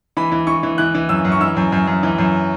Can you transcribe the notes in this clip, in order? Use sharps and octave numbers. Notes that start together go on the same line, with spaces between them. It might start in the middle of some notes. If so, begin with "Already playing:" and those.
E3 B5
E3
E3 C#6
E3
E3 F#6
E3
F#2 E6
F#2
C#6
E3 E6
F#2
F#2
F#2
E3
F#2